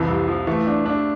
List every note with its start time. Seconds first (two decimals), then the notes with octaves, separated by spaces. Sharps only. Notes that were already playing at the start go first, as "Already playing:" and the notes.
Already playing: C2 F2 E3
0.08 C3
0.28 F3
0.47 E3 A3
0.67 D4
0.86 D4